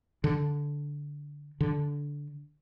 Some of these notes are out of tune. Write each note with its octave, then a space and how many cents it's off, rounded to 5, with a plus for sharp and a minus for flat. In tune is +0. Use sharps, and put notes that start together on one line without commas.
D3 -10
D3 -15